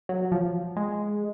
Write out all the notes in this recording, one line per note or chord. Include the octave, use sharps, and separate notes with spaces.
F#3
F3
G#3